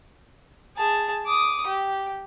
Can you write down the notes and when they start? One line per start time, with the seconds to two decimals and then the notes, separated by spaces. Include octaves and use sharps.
0.77 G#4 A5
1.26 D6 D#6
1.67 G4